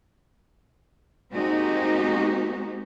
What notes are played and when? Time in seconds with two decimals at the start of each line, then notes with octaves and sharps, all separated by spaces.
1.31 G#3 A#3 C4 D#4 F#4 G4